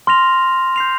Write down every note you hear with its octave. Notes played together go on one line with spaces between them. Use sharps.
C6 F6 A#6 F7
G6 C7 F7